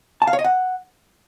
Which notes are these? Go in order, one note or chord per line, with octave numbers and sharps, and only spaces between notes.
A5
F5
C#5
D#5
F#5